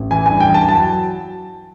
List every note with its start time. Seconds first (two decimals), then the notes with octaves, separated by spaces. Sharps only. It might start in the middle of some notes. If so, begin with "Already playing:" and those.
Already playing: A1
0.11 E3 G#5
0.26 G2 G#5
0.40 G5
0.49 E3
0.54 A5
0.69 F#3 A5